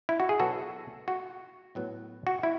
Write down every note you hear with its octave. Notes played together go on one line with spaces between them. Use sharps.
E4
F#4
G#4
B2 F#3 B3 F#4 A4
F#4
A2 F#3 B3
F#4
E4